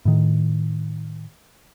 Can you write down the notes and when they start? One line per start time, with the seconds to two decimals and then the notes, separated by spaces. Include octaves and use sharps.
0.05 A2 D#3